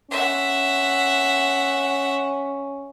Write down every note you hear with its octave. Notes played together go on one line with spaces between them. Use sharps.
C#4 E5 F#5